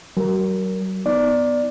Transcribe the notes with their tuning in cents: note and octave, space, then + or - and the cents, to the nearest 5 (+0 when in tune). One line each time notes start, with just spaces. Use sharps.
F#3 +35 A#4 +0
B3 +5 D#4 +0 D5 +0